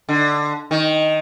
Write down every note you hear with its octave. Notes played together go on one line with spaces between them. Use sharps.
D3
D#3